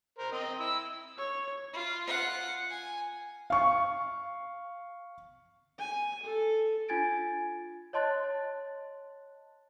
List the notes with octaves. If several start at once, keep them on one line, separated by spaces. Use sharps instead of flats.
A#4 C5
C4 D#5
E4 E6
C#5
F4
F4 F#5
G#5
F5 C#6
G#5
A4
D4 F4 G#5 G#6 A6 D7
C#5 D#5 A5 C6 F#6 A6